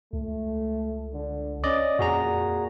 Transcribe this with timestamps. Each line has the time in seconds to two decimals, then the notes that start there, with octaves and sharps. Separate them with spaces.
0.13 C#2 A3
1.14 D3
1.64 C#4 D5 D#5
1.99 F2 A#2 F#4 G#4 A#5